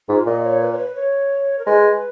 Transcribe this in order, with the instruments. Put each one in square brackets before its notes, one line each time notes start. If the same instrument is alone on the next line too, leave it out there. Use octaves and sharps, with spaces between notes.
[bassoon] G#2 [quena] F4
[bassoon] A#2 [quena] D#5
[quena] C#5
B4
C#5
B4
C#5
A#4
[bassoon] G#3 [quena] B4